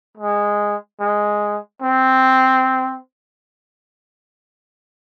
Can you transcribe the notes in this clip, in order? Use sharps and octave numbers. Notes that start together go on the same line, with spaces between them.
G#3
G#3
C4